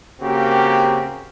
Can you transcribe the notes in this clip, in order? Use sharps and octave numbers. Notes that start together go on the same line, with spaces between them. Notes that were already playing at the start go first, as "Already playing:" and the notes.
C#3 A#3 C4 F#4 G4